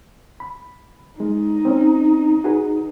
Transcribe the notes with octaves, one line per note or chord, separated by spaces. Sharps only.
B5
G#3 D#4
C4 C#4
F#4 G#4 B4